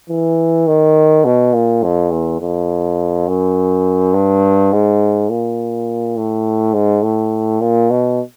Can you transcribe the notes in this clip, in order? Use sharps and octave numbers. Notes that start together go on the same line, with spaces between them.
E3
D#3
B2
A#2
F2
E2
F2
F#2
G2
G#2
A#2
A2
G#2
A2
A#2
B2